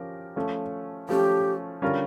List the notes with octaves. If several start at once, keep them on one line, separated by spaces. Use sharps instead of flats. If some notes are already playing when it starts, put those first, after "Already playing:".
Already playing: F3 C#4 G4 A#4
F3 A3 C#4
F3 A3 C#4 G4
D3 G3 C#4 F4 A#4